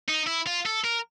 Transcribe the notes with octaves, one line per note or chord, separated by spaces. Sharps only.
D#4
E4
F4
A4
A#4